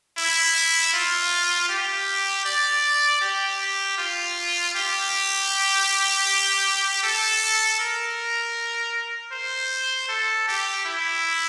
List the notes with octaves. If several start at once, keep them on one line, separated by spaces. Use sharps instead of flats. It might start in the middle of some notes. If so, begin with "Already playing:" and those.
E4
F4
G4
D5
G4
F4
G4
A4
A#4
C5
A4
G4
E4